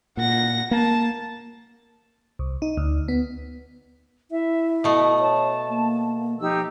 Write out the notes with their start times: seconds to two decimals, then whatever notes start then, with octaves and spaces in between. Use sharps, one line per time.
0.17 A#2 F#5 A#6
0.71 A#3 A5
2.39 C2
2.62 D#4
2.77 D2
3.08 B3
4.31 E4 E5
4.84 B2 A3 D#6
5.19 C#5 A5
5.69 A#3
6.40 F3 D#4 G4 E6